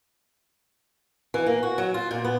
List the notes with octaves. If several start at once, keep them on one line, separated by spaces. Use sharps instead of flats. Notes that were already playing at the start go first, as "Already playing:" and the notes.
E3
A#3
F#4
F#3
F4
A#2
B3